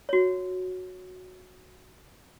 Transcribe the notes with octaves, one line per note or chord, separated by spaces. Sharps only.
F#4 C#5